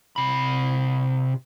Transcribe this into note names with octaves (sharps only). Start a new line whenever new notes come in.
C3 B5